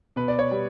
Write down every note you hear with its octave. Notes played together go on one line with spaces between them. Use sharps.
B2 B4
D5
C#5
G3 B3